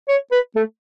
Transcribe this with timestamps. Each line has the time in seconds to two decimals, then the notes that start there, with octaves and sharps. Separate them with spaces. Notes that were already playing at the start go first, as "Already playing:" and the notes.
0.08 C#5
0.31 B4
0.55 A3